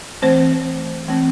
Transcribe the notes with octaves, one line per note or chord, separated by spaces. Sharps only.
E3 A3 C4 C5
E3 A3 C4